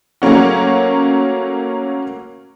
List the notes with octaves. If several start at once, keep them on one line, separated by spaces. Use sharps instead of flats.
F#3 A3 A#3 C#4 F#4